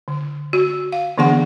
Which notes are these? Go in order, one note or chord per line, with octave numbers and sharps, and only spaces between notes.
D3
F#4
F5
D3 E3 B3 D4 G#4 F#5